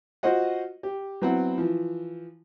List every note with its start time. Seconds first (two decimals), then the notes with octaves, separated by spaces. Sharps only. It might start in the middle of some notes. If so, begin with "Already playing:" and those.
0.23 F4 F#4 C5 D#5 F#5
0.83 G4
1.22 F#3 B3 C4 E4 F#5
1.58 E3 F3